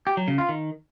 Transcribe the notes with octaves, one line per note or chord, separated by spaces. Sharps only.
G4
F#3
C#3
F4
D#3